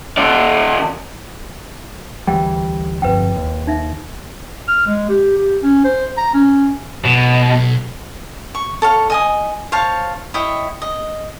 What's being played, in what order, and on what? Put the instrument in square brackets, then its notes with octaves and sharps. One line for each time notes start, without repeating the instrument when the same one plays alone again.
[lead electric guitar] D#3 D5
[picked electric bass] D2 E3 G3 [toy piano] G5
[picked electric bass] G1 F2 [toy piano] B4 G5
[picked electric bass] D#2
[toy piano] D#4 E5
[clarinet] F6
G#3
G4
G4
C#4
C5
A#5
C#4
[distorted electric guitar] B1 [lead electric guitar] B2
[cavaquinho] C#6
A4 C#5 F5
D#5 G#5 D#6
C5 C#5 F5 A5
E4 C#5 D#5 G5
D#5